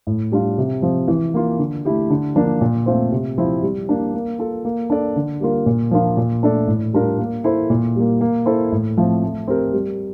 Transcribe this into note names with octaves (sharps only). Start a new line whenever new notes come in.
A2
G3 D4 F4
C3
F3 C4
E3
A#3 F4
D3
A3 E4 G4
D3
F3 A#3 D4
A#2
A3 C4 F4 C5
C3
F3 C4 E4
G3
A#3 D4
A#3
F4 A4
A#3
D4 A4 D5
D3
G3 A#3 F4 A#4
A#2
F3 A#3 D4 F4
A#2
A3 D4 A4 D5
A2
G3 D4 F4 A#4
A#3
E4 A4 C5
A#2
G3 A#3
A#3
E4 A4 C5
A2
F3 A3 C4
A3
C4 G4 A#4
G3